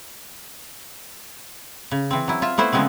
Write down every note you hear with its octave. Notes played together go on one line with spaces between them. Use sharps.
C#3
E3 C4
F#3 E4
F4 E5
A3 B3 E4 C5
C#3 F3 G#3 B3 C4